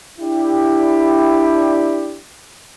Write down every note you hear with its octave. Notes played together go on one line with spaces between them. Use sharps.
D4 E4 G4